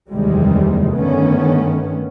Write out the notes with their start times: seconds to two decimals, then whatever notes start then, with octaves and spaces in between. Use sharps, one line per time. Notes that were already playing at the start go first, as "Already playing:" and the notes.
0.12 F1 D#2 C3 E3 G3 G#3
0.94 G2 D3 D#3 A3 B3 C#4